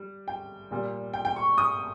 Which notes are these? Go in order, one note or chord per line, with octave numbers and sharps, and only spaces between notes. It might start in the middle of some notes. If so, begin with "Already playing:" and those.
Already playing: G3
G5
A#2 G3
G5
G5
C#6
D#6